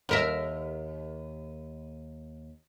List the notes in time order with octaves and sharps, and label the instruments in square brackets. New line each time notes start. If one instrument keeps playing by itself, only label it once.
[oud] D#2 A#4 E5